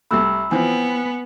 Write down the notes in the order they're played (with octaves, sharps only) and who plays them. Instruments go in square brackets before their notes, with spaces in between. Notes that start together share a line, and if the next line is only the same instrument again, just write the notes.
[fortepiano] C2 C3 A3 [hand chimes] B5 E6 F#6
[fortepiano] E3 F3 C4 [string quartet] B3 [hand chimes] G#5